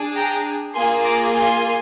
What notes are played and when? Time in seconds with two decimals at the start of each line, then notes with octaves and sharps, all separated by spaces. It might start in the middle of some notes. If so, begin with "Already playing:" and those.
Already playing: D4 G#4
0.15 G5 A#5
0.74 A#3 F4 G#4 G#5 C6
1.04 A#5 D6
1.34 G#5 C6